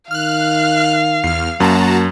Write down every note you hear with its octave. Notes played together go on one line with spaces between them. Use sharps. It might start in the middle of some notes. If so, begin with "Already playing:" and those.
D#3 F5 F6 F#6
E2 F6 C7
F#2 A#3 F#4 A5 A#5